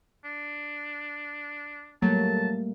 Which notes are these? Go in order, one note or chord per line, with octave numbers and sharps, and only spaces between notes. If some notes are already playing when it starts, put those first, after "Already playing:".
D4
F#3 G3 A3 A#3 A5